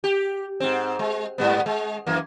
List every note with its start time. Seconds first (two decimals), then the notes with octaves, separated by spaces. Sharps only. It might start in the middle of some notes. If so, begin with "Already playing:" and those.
0.04 G4
0.60 G#2 C4
0.99 G#3
1.38 G#2 G3 B3
1.66 G#3
2.07 F#2 E3 A#3